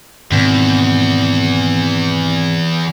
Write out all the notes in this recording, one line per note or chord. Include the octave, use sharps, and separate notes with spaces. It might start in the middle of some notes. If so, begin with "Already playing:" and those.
E2 G#2 B2 D#3 C4